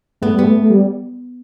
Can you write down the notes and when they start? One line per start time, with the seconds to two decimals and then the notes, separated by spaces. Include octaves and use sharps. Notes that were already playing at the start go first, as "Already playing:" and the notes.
0.22 A3 B3
0.33 G3
0.39 A3 B3
0.55 A3
0.70 G3